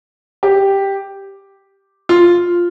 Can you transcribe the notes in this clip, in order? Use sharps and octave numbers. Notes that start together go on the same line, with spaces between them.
G4
F4